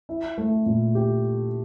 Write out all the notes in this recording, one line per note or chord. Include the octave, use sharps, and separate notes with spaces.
E4
A3
A#2
G4